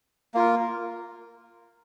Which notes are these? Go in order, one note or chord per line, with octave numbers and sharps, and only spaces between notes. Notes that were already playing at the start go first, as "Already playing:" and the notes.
A#3 F4 A#4